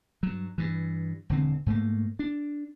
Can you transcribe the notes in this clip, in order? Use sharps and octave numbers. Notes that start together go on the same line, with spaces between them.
G2 F#3
G2 E3
E1 D3 C4
G#2 A3 A#3
D4